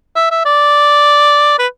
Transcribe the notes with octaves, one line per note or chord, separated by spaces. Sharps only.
E5
E5
D5
B4